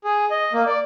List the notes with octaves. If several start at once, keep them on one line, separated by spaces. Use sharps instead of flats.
G#4
D#5
A#3
D5